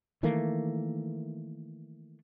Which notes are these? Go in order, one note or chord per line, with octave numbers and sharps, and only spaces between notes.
D#3 E3 A3 A#3